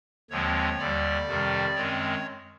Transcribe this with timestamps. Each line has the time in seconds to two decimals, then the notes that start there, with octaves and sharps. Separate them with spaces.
0.30 D#2 D3 F3 G#3 C4 C#5
0.79 D#2 D3 G3 D5
1.27 F2 C3 D#3 G3
1.75 F#2 D#3 G#3 C4 C#5